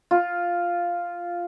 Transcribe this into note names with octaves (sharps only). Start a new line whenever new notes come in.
F4